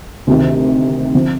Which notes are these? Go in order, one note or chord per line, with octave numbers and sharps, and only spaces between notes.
D2 C3 D#3
D3 F3 C4